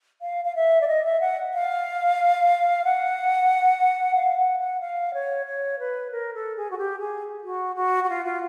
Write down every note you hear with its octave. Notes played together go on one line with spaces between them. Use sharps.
F5
F5
E5
D5
D#5
E5
F#5
F5
F#5
F5
F#5
F#5
F5
C#5
C#5
B4
A#4
A4
G#4
F#4
G4
G#4
F#4
F#4
F#4
F4
F4